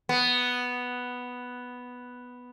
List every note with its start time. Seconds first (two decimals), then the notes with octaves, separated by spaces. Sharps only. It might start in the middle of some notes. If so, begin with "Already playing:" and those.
0.09 B3